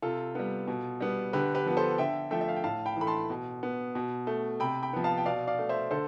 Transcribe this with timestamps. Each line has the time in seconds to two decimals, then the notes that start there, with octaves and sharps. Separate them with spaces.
0.02 C3 F4 A4
0.35 G3 B3
0.68 B2
1.00 G3 B3
1.33 D3 G4 B4
1.55 G4 B4
1.66 F3 B3
1.77 A4 C5
1.98 D3 E5 G5
2.31 F3 A3 E5 G5
2.41 E5
2.49 F5
2.56 G5
2.64 A2 F5 A5
2.86 G5 B5
2.97 E3 A3 B5
3.07 A5 C6
3.30 B2
3.63 B3
3.95 B2
4.27 A3
4.60 C3 G5 B5
4.83 G5 B5
4.93 F3 B3
5.04 F5 A5
5.18 G5
5.25 B2 D5 F5
5.47 D5 F5
5.59 A3
5.69 C5 E5
5.91 D3 A4 C5